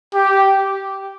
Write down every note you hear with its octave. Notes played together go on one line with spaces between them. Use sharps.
G4